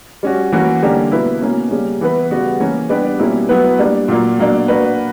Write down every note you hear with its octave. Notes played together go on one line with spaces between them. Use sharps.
G3 C#4 F#4
E3 A#3 C#4 F#4
D3 G3 A#3 C#4 G4
B2 A#3 E4 B4
B2 A#3 C#4
C#3 G3 A#3 C#4
E3 B3 E4 B4
C#3 G3 B3 F#4
E3 A#3 C#4
G3 B3 D4 G4 B4
B2 G3 A#3 C#4 E4
F#3 B3 E4 B4
G3 A#3 D4
A#2 F#3 A#3
B2 F#3 A#3 D4
A#3 D4 F#4 B4